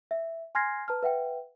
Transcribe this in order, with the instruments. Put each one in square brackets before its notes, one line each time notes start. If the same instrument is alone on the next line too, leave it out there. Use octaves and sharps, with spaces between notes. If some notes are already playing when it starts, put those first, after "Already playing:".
[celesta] E5
G#5 C6 F6 G#6 A#6 C7
B4 A5 A#5 F6
B4 E5 F#5 G5